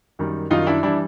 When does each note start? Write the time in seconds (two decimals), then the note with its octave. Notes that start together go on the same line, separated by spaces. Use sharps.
0.19 F#2 D#3 G3
0.50 F#2 D#3 G3 D#4 F4
0.67 D4 E4
0.83 E3 G3 D4 E4